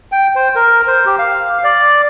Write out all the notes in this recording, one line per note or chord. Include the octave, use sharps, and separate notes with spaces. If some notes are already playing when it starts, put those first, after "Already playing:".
G5
C5
A#4
C5
G4
F5
D5